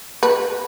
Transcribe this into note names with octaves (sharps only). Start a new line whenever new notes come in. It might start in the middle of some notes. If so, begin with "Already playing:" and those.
B4